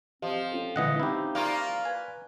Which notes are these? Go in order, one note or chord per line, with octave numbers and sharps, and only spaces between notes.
F3 C4 G4 D#5 F5
C#4 F4 A4
A#2 D3 E3 G#3 D#5 F#5
C4 C#4 D#4 E4 G4 F5
A#3 F4 D5 C#6
B4 G#5